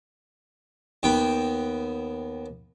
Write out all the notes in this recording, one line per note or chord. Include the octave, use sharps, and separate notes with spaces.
D#2 B3 G5